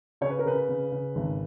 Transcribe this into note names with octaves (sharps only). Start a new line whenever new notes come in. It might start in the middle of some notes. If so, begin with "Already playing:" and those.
C#3 C#5
B4
A#4
C#3 B4
C#3
C#3
G#1